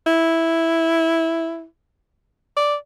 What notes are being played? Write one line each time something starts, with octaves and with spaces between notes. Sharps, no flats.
E4
D5